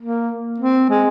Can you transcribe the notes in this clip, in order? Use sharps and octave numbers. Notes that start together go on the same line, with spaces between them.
A#3
C4
G#3